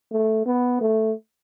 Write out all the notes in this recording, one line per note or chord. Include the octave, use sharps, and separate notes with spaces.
A3
B3
A3